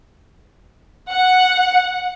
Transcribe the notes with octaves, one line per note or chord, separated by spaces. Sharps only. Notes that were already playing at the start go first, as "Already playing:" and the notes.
F#5